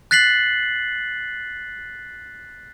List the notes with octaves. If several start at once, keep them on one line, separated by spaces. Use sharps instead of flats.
F#6 A6 B6 C7 F#7